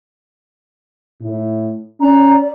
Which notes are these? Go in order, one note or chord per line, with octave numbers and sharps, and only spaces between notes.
A2
C#4 D5 A#5